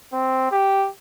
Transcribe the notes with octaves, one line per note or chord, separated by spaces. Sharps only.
C4
G4